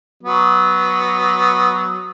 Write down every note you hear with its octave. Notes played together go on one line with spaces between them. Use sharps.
F#3 B3